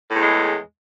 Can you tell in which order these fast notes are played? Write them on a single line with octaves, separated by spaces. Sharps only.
A2 E2 G#3